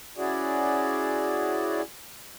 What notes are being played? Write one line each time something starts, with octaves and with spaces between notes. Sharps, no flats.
C#4 E4 F#4 G#4 D5